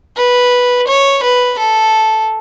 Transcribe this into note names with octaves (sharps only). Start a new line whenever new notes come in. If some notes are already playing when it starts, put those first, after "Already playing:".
B4
C#5
B4
A4